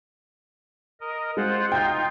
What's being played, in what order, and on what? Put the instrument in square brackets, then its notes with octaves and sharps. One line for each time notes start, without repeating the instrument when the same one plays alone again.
[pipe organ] A#4 D#5
[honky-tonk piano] G#3 [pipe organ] F4 C5 F#5
[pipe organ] D#4 F4 [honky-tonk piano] G5 G6